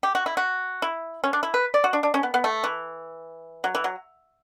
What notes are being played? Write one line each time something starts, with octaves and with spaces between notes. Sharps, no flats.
G4
F#4
E4
F#4
E4
C#4
D4
E4
B4
D5
F#4
D4
D4
C#4
B3
B3
A3
E3
F#3
E3
F#3